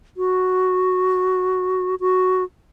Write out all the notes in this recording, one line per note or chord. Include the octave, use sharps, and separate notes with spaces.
F#4
F#4